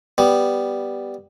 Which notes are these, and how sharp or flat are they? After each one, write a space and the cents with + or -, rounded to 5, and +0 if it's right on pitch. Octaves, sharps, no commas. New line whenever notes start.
G3 +0 B3 +0